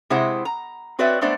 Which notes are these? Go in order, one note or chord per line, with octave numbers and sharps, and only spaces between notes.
C3 G#3 E4 G#4 C5 F#5
A#5
C4 F#4 B4 C#5 D5 E5
G#3 A3 B3 D4 C5 D5